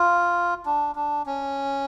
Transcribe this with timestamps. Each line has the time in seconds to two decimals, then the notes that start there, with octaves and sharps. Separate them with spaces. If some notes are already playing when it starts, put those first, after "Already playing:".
Already playing: F4
0.66 D4
0.95 D4
1.26 C#4